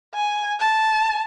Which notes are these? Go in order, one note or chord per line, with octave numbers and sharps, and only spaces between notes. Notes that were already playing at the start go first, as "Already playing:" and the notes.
G#5
A5